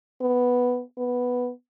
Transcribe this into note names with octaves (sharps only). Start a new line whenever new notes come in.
B3
B3